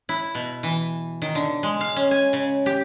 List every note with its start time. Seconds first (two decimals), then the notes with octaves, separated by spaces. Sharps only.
0.09 E4
0.35 B2
0.63 E3
1.22 D#3
1.35 D3
1.63 G#3
1.81 F5
1.96 C#4
2.11 G#5
2.33 C#3
2.66 G4